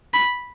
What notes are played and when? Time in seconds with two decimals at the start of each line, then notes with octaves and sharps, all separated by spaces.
0.14 B5